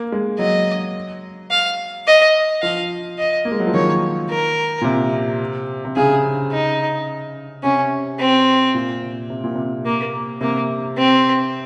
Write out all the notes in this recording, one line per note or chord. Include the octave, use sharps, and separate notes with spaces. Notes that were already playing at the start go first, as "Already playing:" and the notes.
Already playing: A#3
G#3
F#3 D#5
F5
D#5
F3 F5
D#5
A#3
G#3
F#3
F3
D#3 C#5
A#4
A#2
C3
C3
C#3 G#4
D#4
C3 C#4
C4
A#2
C3
C3
A#2
C3
A#3
C3 A#3
C4